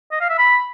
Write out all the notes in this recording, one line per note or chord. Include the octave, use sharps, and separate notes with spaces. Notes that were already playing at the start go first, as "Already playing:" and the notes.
D#5
F5
E5
B5